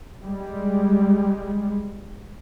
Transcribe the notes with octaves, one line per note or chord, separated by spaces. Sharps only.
G3 G#3